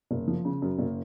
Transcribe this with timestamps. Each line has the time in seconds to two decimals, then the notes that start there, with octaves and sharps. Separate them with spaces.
0.11 F#1
0.27 F3
0.45 C#3
0.62 F#2
0.79 F#1